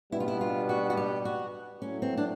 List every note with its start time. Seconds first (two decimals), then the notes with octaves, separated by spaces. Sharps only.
0.12 B2 G3 B3 D4 E4
0.20 F4
0.28 E4
0.41 F4
0.69 F#4
0.90 F#4
0.97 G4
1.25 F#4
1.81 A2 F#3 A3 C#4
2.02 C4
2.17 D4